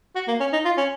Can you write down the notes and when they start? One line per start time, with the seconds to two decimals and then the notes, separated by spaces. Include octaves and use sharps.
0.16 F#4
0.28 A#3
0.40 C#4
0.53 D#4
0.65 F4
0.78 C#4